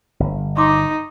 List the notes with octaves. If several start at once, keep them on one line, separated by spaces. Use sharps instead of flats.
G1
D#4 C6 D6